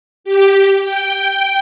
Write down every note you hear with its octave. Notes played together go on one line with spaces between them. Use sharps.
G4
G5